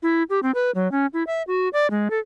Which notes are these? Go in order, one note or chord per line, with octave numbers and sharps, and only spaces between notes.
E4
G4
C4
B4
F#3
C#4
E4
E5
F#4
D5
G#3
A4